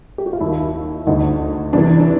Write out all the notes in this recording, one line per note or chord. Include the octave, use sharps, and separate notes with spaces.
G4
F#4
F4
D#2 D#3 E4
D2 D3 D#4
E2 C3 E3 D4
D4